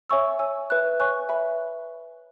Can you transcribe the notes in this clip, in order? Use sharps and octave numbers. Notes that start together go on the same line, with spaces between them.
C#5 E5 G#5 C#6 E6
C#5 G#5 E6
B4 E5 B5 F#6
C#5 G#5 C#6 F#6
B4 E5 G#5 B5